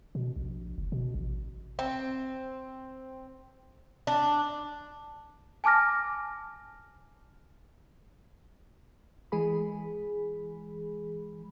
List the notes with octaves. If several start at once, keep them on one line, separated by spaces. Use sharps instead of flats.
B2
A#1
F#1
B2
A1
C4
D4
G#5 A5 D6 F6 A#6
E3 G#3 G#4 B5